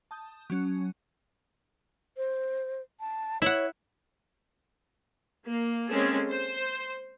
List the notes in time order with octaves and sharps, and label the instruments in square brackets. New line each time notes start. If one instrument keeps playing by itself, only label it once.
[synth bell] A5 D#6 G6
F#3 C#4
[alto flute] C5
A5
[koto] E4 F#5 [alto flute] C#5
[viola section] A#3
G#3 A#3 C4 C#4 G#4 A4
C5